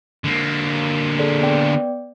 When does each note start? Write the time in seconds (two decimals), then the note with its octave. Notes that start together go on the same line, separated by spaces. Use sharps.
0.24 D3 A#3
1.19 G#4 A4 D5
1.41 B3 D5 G5